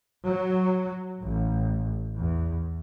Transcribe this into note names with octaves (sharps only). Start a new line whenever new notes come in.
F#3
A1
E2